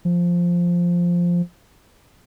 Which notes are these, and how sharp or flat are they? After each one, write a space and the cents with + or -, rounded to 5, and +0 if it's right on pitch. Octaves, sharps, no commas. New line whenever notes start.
F3 +0